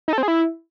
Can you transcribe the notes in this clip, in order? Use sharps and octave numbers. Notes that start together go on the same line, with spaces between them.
D#4
A4
C4
G#4
E4